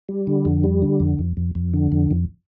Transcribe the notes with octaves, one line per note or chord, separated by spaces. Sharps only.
G3
D3
F2
G3
D3
F2
F2
F2
F2
D3
F2
F2